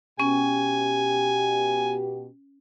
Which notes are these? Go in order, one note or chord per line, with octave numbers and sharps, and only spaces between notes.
B2 C#4 G4 G#5